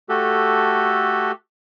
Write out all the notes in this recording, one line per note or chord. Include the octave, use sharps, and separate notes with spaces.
A3 F#4 G4 A4